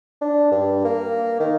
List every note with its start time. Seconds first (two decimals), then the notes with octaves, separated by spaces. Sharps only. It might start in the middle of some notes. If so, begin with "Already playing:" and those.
0.21 D4
0.51 G2
0.85 A#3
1.40 D#3